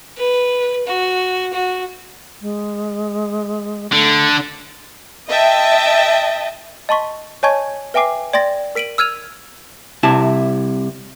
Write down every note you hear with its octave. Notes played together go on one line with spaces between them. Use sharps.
B4
F#4
F#4
G#3
D3 A3
D#5 E5 G5 A5
D#5 A5 C6 C#6 B6
C#5 D#5 G#5 A5 C#6 G#6
B4 E5 G5 G#5 D6 C7
D5 G5 C6 A6 A#6
A#4 B6 D7 D#7 F#7
E6 F6 G#6 D#7 F7
C2 C3 E4 A5